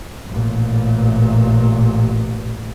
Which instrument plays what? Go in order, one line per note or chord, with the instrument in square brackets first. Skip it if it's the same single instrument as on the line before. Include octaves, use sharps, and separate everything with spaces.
[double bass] A1 A#2